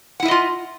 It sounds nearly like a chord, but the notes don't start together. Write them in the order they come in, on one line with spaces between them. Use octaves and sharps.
F#5 E4 E5 D#5 F4